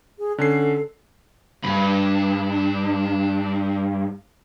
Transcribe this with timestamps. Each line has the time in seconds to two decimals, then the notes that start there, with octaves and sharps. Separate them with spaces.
0.19 G#4
0.38 D3 C#4 A4 C7
1.64 E2 G2 D4 B5